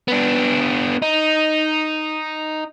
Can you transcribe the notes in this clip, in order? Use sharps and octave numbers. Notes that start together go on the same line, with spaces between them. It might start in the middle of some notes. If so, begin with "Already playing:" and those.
B3 D4
D#4